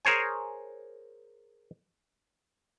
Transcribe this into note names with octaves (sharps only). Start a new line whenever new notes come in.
G#4 A#4 C5 C#5 G#5